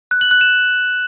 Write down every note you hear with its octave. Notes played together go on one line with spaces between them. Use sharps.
F#6
F#7
F#6
E7